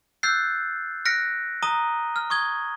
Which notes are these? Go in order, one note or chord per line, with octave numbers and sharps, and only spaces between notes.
E6 F#6 G6 A6 C7
F6 F#6 A#6 B6 C#7 D7
A#5 D#6 D#7 G7
F6
C#6 D#6 G#6 G7